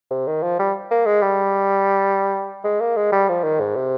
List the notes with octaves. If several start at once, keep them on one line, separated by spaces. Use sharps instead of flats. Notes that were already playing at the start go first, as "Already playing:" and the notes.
C3
D#3
F3
G3
A#3
G#3
G3
G#3
A#3
G#3
G3
F3
D#3
G#2
C3